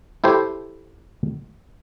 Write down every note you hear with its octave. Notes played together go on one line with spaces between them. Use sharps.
E4 G4 A4 C5